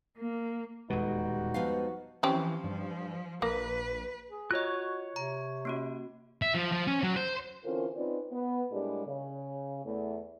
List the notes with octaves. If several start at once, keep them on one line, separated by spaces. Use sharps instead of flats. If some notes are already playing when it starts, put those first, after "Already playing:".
A#3
D#1 E2 B2 G3 G#3 D#4 F#4 B4
F3 B3 F5
E3 F3 C4 C#4 G4
G2
A#1 A#3 B4
G#4
F4 F#4 C#5 D#5 F#6
C3 A#5
A#3 C#4 F#4
E5
F3
F3
C#4
F#3
C5
D3 E3 C4 C#4 F4 A#4
C4 C#4 D#4 F4 B4 D5
B3
A2 G3 G#3 A#3 D4 G4
C#3
E2 A3